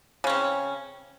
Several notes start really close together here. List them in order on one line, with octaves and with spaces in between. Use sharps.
C#3 C#4 C4